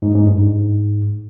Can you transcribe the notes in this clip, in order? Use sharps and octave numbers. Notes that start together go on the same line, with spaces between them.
G#2
G#2
G2
G#2